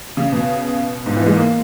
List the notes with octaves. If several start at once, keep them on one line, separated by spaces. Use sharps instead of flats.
C#3
B2
G#2
E3
G#3
A#3